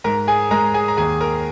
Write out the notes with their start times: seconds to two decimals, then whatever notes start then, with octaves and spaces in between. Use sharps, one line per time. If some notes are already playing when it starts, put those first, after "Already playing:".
0.04 G#2 A#4 A#5
0.28 G#4 G#5
0.51 G#3 A#4 A#5
0.74 G#4 G#5
0.88 A#5
0.97 D#2 G#4 G#5
1.21 A#4 A#5